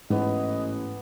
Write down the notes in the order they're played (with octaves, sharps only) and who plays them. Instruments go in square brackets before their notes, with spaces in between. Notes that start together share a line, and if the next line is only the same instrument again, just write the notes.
[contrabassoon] A1 [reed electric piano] G#2 [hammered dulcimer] E3 B3 [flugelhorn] D#5